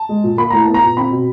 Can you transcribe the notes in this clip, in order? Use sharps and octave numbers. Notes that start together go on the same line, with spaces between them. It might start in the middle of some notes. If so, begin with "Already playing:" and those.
Already playing: A5
G#3
A#2
A#3 B5
A2 A#5
B3 A5
A#5
A#2
C4 B5
B2